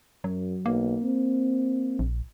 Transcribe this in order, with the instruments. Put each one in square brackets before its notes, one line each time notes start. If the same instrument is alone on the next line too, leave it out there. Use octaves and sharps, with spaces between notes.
[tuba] F#2 [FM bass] F#3
[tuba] B1 [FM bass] A#3
[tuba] C4
[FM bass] A#1